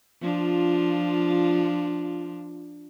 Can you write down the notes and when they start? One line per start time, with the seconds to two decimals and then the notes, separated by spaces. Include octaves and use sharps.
0.21 F3 D4 F4